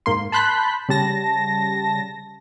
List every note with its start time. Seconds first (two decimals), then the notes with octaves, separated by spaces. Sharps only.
0.06 G#2 A#3 C6
0.32 A5 B5 C6 F#6 G6 B6
0.89 C#3 G3 A5 A#6